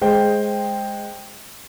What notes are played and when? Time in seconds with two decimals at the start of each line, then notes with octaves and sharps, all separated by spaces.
0.01 G#3 C5 G5